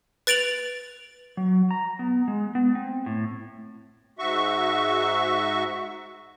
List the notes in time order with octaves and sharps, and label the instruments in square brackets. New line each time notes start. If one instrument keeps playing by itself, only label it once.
[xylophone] B4 A6 D7 F7 F#7
[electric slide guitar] F#3
A#5
B3
G#3
B3
C4
A2
[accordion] G#2 F#4 E5 C#6